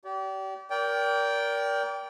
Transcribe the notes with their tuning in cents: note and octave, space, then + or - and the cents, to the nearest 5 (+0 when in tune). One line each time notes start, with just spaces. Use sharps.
G4 -35 D5 -35
A#4 +15 D5 -30 G5 +0